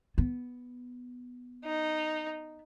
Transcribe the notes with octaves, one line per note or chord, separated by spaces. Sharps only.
B3
D#4